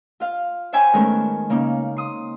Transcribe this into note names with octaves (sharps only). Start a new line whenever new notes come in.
F4 F5
C5 C#5 E5 G5 G#5 B5
D#3 G#3 A3 B3 C#4 A#4
C#3 A#3 C#4 D#4
C6 D#6